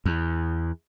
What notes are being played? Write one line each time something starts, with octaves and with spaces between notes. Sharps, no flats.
E2